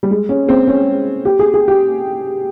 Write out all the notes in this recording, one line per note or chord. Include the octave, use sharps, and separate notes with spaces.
G3
G#3
C#4
C4
C#4
G4
G#4
G#4
G4